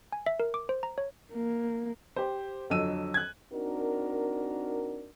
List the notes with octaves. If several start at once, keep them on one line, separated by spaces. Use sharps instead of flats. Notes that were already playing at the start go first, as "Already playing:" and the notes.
G#5
E5
A#4
D6
C5
A#5
C#5
A#3
G4 C5
F2 D3 F#3 D#5 E6 D#7
F#6 G#6
C4 D4 D#4 F#4 A#4